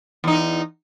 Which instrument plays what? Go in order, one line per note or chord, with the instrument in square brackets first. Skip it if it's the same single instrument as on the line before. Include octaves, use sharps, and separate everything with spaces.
[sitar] E2 D#4